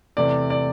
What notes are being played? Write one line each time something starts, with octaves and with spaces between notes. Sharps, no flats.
E2 C3 A3 D5
D5